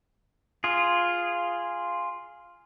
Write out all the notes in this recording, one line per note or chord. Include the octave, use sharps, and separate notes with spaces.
F4 G#4